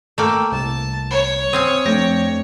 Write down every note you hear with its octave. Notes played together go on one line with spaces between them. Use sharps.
A3 A#3 G5 E6
C2 A5
C#5
C4 F5 G#5 D#6
F2 A3 D4 G5 A#6